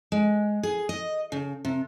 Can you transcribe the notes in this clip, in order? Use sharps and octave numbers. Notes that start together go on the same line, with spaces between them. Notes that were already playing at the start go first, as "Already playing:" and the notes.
G#3
G#4
D#5
C#3
C3